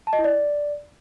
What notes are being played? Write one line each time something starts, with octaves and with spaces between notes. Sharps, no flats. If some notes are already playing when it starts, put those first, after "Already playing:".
A5
D#5
E4
D5